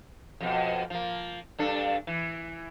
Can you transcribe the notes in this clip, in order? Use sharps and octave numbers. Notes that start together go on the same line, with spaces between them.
F2 B2
F3 A#3
G2 D4 A4
E3